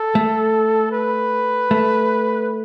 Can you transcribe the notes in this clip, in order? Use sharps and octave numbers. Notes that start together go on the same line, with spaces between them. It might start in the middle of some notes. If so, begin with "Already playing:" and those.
Already playing: A4
A3
B4
A3